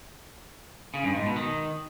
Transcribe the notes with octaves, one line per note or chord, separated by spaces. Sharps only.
C#3
G2
G#2
B2
D#3